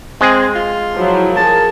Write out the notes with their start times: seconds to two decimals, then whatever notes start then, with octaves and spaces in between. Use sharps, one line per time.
0.21 G#3 C4 G#4
0.55 F4
0.96 F3 F#3 E4
1.37 G#4 A#4 A5